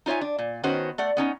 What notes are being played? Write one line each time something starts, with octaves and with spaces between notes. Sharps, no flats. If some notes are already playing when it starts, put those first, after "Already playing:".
D#4 F4 C#5 E5 G#5
D4
A#2
D#3 B3 C#4 F#4 C5
A3 D5 F#5
B3 C#4 D#4